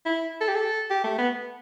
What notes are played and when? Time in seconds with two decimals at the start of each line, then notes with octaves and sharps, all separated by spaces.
0.06 E4
0.41 A4
0.48 G4
0.55 A4
0.90 G4
1.04 A3
1.19 B3